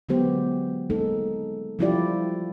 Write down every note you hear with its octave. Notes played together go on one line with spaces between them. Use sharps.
D3 F#3 G#3 B3 G4 C5
G#3 A#3 D#4 A4
F3 G3 E4 F4 G4 D5